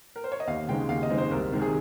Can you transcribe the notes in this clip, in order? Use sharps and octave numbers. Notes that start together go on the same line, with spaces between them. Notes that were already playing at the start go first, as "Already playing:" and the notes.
A#4
C5
C#5
D#5
D#2 F5
C#3 G#3 C4 D#4 G5
D#2 F5
D#5
C#3 G#3 C4 D#4
C5
C2 A#4
C3 D#3 G#3
G#4